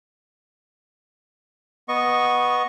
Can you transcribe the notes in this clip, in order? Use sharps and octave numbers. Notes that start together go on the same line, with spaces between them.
B3 D#5 C#6